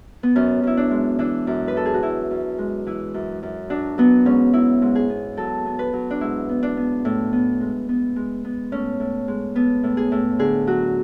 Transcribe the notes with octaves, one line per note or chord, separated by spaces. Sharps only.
B3
F#2 C#4
F#2 E4
D4
G#3
E3 D4
F#2
B4
E3 A4
G#4
F#4
F#2 E4
F#2
G#3
E3 E4
F#2
F#2
F#3 D4
F#3 B3
G#2 C#4
F#3 E4
G#2
G#4
B3
F#3 A4
B3
B4
F#3
D4
G#2 E4
B3
D4
B3
A2
B3
G#3
B3
G#3
B3
A2 C#4
A2
G#3
A2 B3
A2
G#4
A2
D3 G#4
F#3 F#4